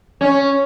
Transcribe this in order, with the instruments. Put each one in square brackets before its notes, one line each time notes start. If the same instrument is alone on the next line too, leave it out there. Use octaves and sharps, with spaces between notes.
[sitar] C#4